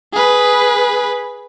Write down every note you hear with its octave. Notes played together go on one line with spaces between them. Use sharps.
G#4 B4